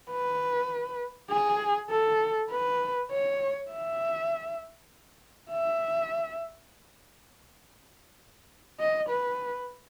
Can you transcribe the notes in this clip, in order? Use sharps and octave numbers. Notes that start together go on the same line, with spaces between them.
B4
G#4
A4
B4
C#5
E5
E5
D#5
B4